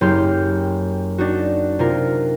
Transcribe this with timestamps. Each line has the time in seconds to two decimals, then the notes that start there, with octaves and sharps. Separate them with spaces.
0.01 F#1 G4 C6 F6 G6
1.18 D4 D#4 F#4
1.79 C3 F4 A#4